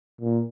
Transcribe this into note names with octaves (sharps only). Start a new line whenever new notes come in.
A#2